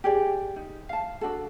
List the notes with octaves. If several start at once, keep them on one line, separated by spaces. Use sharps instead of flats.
G4 G#4 D5
D#4
F5 A5
D4 F#4 A4